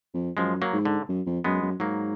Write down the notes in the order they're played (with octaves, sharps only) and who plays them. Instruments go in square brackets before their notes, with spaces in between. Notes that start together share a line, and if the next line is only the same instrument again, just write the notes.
[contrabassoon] F2
[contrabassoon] F#2 [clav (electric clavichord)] F3 G#3
[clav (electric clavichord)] F#3 A#3
[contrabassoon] G#2
[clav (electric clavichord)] D3
[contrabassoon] F#2
F2
[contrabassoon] F#2 [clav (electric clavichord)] G#3 B3
[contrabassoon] F#2
[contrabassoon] G#2 [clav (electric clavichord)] F#3 A#3